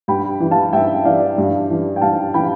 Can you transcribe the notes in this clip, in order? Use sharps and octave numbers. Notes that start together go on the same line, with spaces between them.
G2 G5 B5
E3
F5 A5
G2 E5 G5
E3 D5 F5
G2
E3
G5
G2 F5 A5
E3 G5 B5